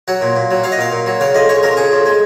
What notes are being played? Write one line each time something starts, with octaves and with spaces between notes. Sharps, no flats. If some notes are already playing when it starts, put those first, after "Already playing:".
F#3 F#5
A#2
A#2
F#3
F#3 F5
D#5
A#2 F5
A#2
F#3
C#3 F5
F2 D#5
G#3 C#5
F2 A#4
C#3 G#4
F2
G#3